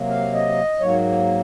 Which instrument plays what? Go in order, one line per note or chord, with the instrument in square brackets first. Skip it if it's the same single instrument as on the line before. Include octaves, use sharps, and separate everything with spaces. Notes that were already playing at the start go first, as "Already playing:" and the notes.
Already playing: [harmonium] C3 F#3 A#3
F5
D#5
G#2 F#3 A#3 C#5